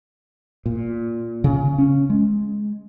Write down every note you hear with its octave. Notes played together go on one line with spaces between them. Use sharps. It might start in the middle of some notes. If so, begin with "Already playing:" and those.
A#2
C#3
C#4
G#3